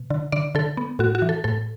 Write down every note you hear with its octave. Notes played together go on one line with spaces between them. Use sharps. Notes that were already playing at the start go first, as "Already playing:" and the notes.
Already playing: B2
D3
D3 D5
D3 A4
B3
A2 F#4
F#4
E3
A4
A2 A4